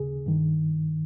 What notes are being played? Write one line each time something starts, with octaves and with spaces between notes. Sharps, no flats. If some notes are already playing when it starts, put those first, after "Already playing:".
Already playing: D#2 C#3 G#4
G2 D#3